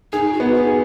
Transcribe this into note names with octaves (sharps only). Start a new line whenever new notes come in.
D#4 G#4
F#4
B3
D#4
G#4